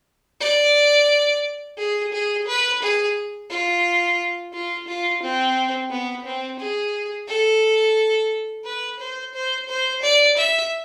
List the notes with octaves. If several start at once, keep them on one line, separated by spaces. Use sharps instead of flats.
D5
G#4
G#4
B4
G#4
F4
F4
F4
C4
B3
C4
G#4
A4
B4
C5
C5
C5
D5
E5